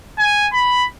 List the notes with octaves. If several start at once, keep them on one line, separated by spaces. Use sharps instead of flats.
G#5
B5